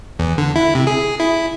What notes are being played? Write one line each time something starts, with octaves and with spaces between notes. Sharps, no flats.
E2
D3
E4
C3
G#4
E4